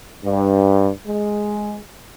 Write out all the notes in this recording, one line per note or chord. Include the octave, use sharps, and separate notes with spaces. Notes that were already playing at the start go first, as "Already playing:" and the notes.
G2
G#3